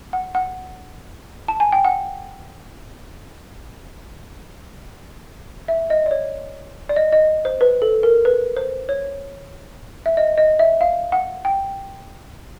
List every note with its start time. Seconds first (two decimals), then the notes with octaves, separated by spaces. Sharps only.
0.13 F#5
0.35 F#5
1.48 A5
1.60 G#5
1.72 G5
1.85 F#5
5.68 E5
5.90 D#5
6.06 D5
6.11 C#5
6.89 D5
6.96 D#5
7.12 D#5
7.45 C5
7.61 B4
7.82 A4
8.03 A#4
8.25 B4
8.56 C5
8.89 C#5
10.06 E5
10.17 D#5
10.38 D#5
10.59 E5
10.81 F5
11.12 F#5
11.45 G5